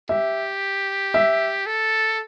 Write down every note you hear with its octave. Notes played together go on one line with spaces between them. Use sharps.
G4 E5
E5
A4